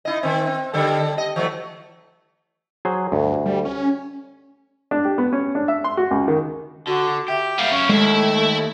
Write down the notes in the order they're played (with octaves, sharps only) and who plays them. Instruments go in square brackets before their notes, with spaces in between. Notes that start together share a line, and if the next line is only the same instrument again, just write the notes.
[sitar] D#4 E4 D#5
D#3 C4
C4
D3 G3 A4
D#5
E3 F#3 A3
[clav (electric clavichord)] F#3 G#4 C5
[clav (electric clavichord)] D2 [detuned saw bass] G2
[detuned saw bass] G3
C#4
[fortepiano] D4
G4
B3
C#4
D4
E5
C6
F#4
C#2
D#3
[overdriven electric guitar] D3 [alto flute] F#4
[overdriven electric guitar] G4 [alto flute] E5
[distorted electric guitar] A#2 G3 [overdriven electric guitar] B3 F5
[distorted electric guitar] F#2 E4 [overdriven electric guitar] C#4
[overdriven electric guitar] D#2 [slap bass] G#3 [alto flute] A3 [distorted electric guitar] E4 E5